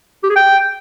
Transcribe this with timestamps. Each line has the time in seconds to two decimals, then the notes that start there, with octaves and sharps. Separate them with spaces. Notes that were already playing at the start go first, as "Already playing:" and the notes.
0.24 G4
0.30 G#4
0.36 G5